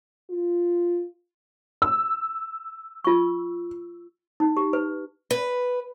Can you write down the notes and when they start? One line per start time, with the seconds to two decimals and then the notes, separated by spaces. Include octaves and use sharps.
0.30 F4
1.82 E6
3.04 F4 C#6
4.40 D#4
4.57 G4
4.73 B4
5.31 B4